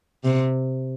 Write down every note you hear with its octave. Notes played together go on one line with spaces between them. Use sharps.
C3